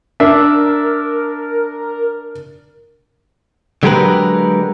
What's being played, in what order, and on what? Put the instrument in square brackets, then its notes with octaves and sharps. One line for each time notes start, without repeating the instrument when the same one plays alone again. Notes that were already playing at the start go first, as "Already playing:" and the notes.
[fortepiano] D4 E5 [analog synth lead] A#4
[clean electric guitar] D3 F#3 G#3 G4 A#4 B4